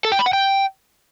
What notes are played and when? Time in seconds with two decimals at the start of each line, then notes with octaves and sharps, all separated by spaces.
0.05 A4
0.12 G5
0.19 B5
0.26 F#5
0.33 G5